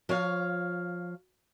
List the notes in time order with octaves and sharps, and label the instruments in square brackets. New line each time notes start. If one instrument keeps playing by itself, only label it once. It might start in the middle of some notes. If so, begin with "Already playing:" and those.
[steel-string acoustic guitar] F3 C#5 F5